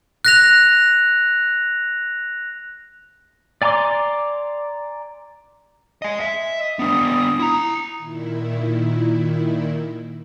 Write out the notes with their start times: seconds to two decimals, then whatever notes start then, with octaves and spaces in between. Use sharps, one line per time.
0.25 F#6 A#6 F7
3.62 D5 G#5 A#5 C6 D6
6.02 D#5 G#5
6.20 E5
6.58 D#5
6.79 B3 D4 D#6
7.39 E4 A#5
7.97 A#2 D#3 E4